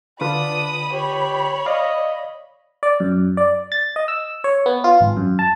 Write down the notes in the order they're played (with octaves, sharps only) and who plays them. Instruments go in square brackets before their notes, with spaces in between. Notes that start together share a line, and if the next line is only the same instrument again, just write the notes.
[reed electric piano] D3 F4 B4 [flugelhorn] D4 [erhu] B5 [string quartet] D#6
[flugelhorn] G4 [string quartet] C#5
[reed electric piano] D5 F5 [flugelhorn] D#5
[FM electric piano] D5
F#2
D5
A6
D#5
E6
C#5
B3
F4
G#1
F#2
A5